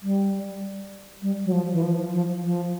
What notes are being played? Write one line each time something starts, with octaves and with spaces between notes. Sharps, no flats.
G3
G3
F#3
F3
E3
F3
F3
F3